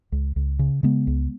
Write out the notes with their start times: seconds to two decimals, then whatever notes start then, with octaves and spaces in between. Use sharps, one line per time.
0.12 C#2
0.36 C#2
0.59 C#3
0.83 C#3 G#3 B3
1.07 C#2